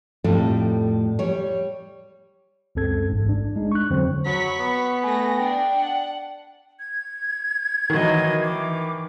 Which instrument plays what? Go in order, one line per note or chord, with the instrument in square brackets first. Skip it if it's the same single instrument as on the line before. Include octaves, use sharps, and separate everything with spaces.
[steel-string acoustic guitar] F2 A2 G3 A4
G3 C#5
[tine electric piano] C#2 F#2 C4 A4 G#6
A1 G#2
D4
G#3 D#4
C#6 F#6
F2 D3 F#3 C4 C5
[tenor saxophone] F#3 [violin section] B5 C#6 B6
[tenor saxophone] B3
[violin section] A3 A#6 [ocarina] G#5
[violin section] D4 [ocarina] G5
[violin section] F#5
[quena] G#6
[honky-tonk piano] D#3 [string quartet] E3 F#3 D#5
[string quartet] E3 [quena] D6